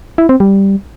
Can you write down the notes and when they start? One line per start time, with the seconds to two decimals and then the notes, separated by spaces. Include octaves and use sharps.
0.18 E4
0.29 C4
0.40 G3